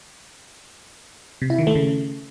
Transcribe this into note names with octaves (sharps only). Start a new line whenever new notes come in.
C3
E4
D#3
A3
C#3